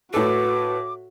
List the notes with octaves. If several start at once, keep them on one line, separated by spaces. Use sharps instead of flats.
A2 F#4 A4 B4 D6